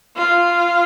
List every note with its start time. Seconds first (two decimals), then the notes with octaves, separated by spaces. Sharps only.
0.17 F4